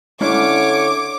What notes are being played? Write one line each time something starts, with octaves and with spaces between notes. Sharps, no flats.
D3 C#4 D4 E4 C#5 D6